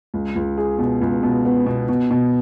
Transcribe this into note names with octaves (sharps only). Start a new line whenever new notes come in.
C#2
C#2
G#4
B2
C#2
B2
B3
B2
B2
B2